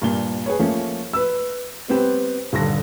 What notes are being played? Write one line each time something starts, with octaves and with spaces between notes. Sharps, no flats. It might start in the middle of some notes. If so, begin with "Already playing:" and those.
G2 A#2 G7
G#4 B4 C#5
F3 A3 A#3 C#4
B4 E6
G3 B3 C4 G4 B4
D#1 G2 D3 A#6